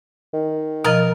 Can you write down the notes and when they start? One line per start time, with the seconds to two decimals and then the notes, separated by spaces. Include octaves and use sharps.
0.34 D#3
0.85 B2 F3 A#4 D#5